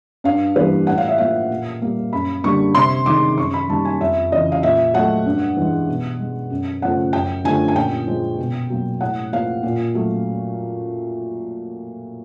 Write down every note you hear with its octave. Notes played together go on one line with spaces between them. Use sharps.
G2 F5
E3 G3 A#3 B4
A2 F#5
F5
E5
F3 A#3 F5
A#2
G3 A#3
F#2 B5
D3 G3 A#3 C#6
C3 C6
D#3 G#3 D6
F#2 C#6
B5
D#3 G3 A#3 A5
G#5
F2 E5
C#3 E3 D#5
F5
A#2 E5
F#3 A3 F#5
G2
E3 G#3
B2
G#3
F#2
C#3 F3 A3 F#5
F#2 G5
D3 F3 A3 G#5
G#5
A#2 G5
F3 G#3
B2
F#3 A#3
A2 F#5
F3 A#3 F5
A#2
F#3 A3